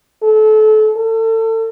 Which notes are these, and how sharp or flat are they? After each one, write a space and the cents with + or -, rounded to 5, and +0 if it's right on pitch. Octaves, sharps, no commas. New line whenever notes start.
A4 -30
A4 +30